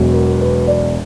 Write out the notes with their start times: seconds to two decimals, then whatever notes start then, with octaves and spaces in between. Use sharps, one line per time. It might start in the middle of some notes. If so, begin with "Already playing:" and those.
Already playing: E1 E2 B2 F#3
0.13 A#4
0.41 B4
0.67 D5